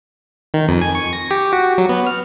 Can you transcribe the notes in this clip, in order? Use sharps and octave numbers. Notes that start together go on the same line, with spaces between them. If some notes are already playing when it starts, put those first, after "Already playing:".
D#3
F2
G#5
C#6
A#6
G4
F#4
F#3
B3
F6